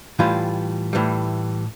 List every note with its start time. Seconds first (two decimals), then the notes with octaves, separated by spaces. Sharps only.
0.19 A2 E3 G3 F4
0.93 A2 E3 G3